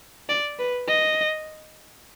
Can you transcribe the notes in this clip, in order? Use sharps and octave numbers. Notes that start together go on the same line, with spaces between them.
D5
B4
D#5